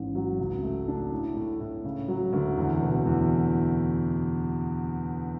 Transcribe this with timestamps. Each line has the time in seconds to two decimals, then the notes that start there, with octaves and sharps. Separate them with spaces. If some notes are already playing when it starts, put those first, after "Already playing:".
Already playing: A1 G#2
0.15 F#3
0.39 C#2
0.62 A3
0.88 D4
1.12 A2
1.37 A2
1.60 A2
1.84 C#3
2.08 F#3
2.33 D2
2.57 E2
2.82 B2
3.06 E2